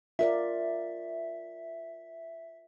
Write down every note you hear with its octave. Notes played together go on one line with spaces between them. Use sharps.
F4 A#4 D5 E5